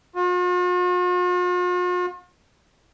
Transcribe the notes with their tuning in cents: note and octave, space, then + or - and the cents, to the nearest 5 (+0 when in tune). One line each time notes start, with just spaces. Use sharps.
F4 +45